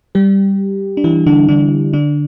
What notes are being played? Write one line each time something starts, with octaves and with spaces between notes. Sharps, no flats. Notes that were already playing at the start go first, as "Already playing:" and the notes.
G3 G4
D4
E3 E4
D3 D4
D3 D4
D3 D4